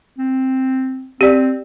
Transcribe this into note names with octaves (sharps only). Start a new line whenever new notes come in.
C4
C4 G4 D5